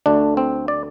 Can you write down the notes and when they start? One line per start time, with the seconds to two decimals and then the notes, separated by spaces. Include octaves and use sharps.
0.06 D2 D3 A3 D4
0.37 C4
0.68 D5